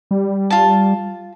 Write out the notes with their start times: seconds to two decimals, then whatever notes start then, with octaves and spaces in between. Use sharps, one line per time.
0.11 G3
0.50 F4 A5